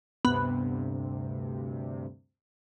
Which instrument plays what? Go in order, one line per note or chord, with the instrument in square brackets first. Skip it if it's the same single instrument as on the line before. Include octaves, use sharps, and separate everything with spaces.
[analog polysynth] D2 G2 C3 [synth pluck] B3